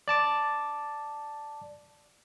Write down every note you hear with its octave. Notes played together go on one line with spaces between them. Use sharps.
D5 A5 D6